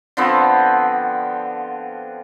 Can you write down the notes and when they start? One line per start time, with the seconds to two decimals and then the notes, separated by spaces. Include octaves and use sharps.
0.17 D3 F3 B3 C4